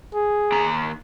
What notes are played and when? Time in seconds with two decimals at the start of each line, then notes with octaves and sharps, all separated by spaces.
0.14 G#4
0.52 D#2 A#5